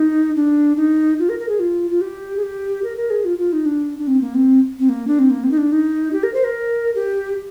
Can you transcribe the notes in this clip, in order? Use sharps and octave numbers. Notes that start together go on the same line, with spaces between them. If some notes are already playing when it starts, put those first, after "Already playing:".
Already playing: D#4
D4
D#4
F4
A#4
A#4
G#4
F4
F4
G4
G#4
G4
A#4
A#4
G#4
F4
F4
D#4
D4
D4
C4
A#3
C4
C4
A#3
D4
C4
A#3
C4
D#4
D4
D#4
G4
A#4
C5
A#4
G4